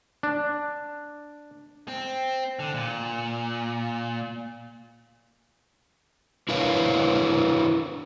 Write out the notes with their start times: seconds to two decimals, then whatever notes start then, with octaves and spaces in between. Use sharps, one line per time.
0.23 D4
1.88 C4
2.59 D3
2.74 A#2
6.49 D4 E4 A#4 B4 C#5 F5